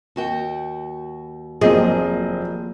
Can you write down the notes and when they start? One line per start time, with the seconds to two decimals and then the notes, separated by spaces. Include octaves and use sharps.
0.16 D#2 F#4 G5
1.61 F1 F3 F#3 A#3 C4 G#4 D#5